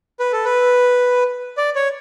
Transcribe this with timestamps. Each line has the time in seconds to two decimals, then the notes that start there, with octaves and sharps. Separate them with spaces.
0.20 B4
0.32 A4
0.45 B4
1.57 D5
1.75 C#5